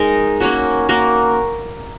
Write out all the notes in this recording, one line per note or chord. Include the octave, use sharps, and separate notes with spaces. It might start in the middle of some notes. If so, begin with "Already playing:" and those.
Already playing: G#3 D#4 A#4
A#3 C#4 F#4
A#3 F#4 A#4